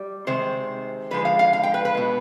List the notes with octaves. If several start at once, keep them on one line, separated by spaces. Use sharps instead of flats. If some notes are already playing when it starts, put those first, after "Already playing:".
Already playing: G3
C3 D#3 G#3 C5
D3 F3 G#3 B4
F5
F5
F5
G5
B4
B4
B2 G#3